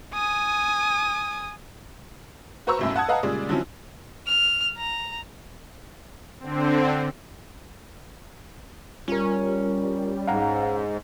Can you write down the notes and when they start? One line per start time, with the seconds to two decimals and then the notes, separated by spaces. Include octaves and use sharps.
0.14 G#5 D#6
2.67 F#4 B4 C5 A#5 C#6 E6
2.79 B1 F#2 A2
2.96 F#5 A5 D#6 G#6
3.08 B4 D#5 F5 F#5 A5 A#5
3.23 A#2 C#3 G3 G#3 D5
3.49 D3 F3 F#3 C4 C#4 E4
4.27 F6
4.77 A#5
6.40 D3 C4
9.08 G3 C#4 F4 A#4
10.28 G#2 F5 F#5 A#5